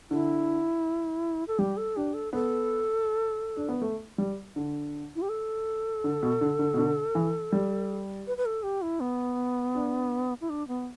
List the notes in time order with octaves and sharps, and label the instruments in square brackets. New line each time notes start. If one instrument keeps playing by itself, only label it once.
[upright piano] D3 [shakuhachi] E4
[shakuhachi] A4
[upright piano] G3 [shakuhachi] G4
[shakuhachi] A4
[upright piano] D4 [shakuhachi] G4
[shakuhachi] A4
[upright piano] B3 [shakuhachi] A4
[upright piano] D4
B3
A3
G3
D3
[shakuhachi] E4
G4
A4
[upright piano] D3
B2
D3
D3
B2
D3
E3
G3
[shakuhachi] B4
B4
A4
G4
E4
B3
[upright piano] D4
[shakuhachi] E4
D4
B3